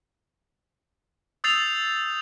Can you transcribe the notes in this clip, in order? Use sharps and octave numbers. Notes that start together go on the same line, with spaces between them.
D#6 E6 G6 A6 C7 F7